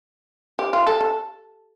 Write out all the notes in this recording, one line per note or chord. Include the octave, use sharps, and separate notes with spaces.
G4
F4
A4
A4